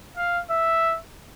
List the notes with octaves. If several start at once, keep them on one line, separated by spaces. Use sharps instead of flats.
F5
E5